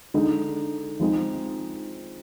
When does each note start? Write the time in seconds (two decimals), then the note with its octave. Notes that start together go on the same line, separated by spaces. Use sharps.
0.14 D3 G#3 D#4 G#4
1.00 F3 G#3 C4 D#4